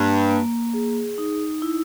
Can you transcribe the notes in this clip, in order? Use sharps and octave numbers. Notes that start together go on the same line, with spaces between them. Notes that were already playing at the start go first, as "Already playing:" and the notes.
Already playing: G2 A#3
A#3
G#4
D#4
E4